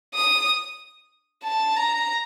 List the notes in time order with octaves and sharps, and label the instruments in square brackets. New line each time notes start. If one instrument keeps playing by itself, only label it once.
[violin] D#6
A5
A#5